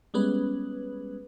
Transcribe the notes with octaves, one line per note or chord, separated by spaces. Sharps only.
G3 G#3 B3 C#4 B4